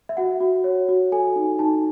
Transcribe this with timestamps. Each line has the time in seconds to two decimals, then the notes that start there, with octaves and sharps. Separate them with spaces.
0.09 E5
0.17 F#4 F#5
0.40 F#4
0.64 C#5
0.89 F#4
1.12 A4 G#5
1.36 D#4
1.59 D#4 A5